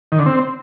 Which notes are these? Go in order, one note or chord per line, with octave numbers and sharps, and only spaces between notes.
D#3
D3
C4